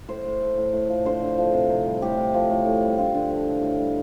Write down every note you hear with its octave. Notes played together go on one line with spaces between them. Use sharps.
A2 C5
A2
A3
A2
A2
F3
D3 C5
D3
F3
C3
C3
G3
A2 G4
A2
F3
A2
A2
G3
D3 F4
D3
F3
A2
A2
G3